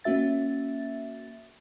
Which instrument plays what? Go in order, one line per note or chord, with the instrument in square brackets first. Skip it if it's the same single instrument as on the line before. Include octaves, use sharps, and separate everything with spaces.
[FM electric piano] A#3 C#4 F#4 E5 A6